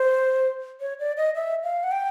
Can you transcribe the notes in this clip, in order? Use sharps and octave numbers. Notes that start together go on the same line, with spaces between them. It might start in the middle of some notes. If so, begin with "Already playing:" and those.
Already playing: C5
C#5
D5
D#5
E5
F5
F#5
G5